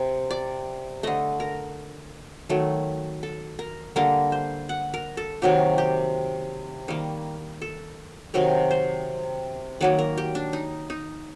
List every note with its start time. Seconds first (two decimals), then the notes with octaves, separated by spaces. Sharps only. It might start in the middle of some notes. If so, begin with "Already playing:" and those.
Already playing: C3
0.31 D5
1.03 D3 A3 D#5
1.40 A#4
2.49 D#3 F#3 A3
3.23 A4
3.59 A#4
3.96 D3 G3 A#3 A#4
4.32 C5
4.69 F#5
4.94 A#4
5.17 A4
5.42 C3 D#3 F#3 A#3 G4
5.78 G4
6.88 D#3 G3 A#3
7.62 A4
8.34 C3 D#3 F#3 A#4
8.71 C5
9.81 D#3 F#3 A#3 D5
9.99 A#4
10.18 G4
10.35 D4
10.53 D#4
10.90 D#4